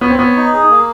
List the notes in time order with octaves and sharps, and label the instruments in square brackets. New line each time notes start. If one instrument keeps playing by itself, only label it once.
[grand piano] B3 [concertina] C#5
[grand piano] C4
[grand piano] B3 [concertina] C#5
[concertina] D#4
G#4
A#3